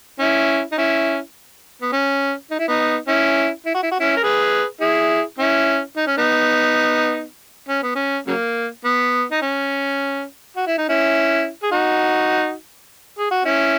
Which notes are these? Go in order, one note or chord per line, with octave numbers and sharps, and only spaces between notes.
C#4 E4
D#4
C#4 E4
B3
C#4
D#4
E4
B3 D#4
C#4 E4
E4
F#4
E4
F#4
C#4 E4
A#4
G#4 B4
E4 G#4
C#4 E4
D#4
C#4
B3 D#4
C#4
B3
C#4
C#3 F#3 A#3
B3
D#4
C#4
F#4
E4
D#4
C#4 E4
G#4
D#4 F#4
G#4
F#4
C#4 E4